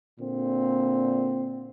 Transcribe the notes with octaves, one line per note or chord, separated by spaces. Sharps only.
A#2 D3 C4